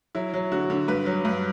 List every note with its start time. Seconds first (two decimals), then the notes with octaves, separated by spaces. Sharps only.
0.15 F#3 E4
0.34 F#3
0.52 D3 F#4
0.70 D3
0.88 G2 B4
1.06 F#3
1.25 G2